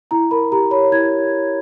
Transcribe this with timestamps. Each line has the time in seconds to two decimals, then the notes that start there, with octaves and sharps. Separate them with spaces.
0.11 E4 A#5
0.31 A#4 B5
0.52 G4 A#5
0.71 C#5 B5
0.92 E4 G#6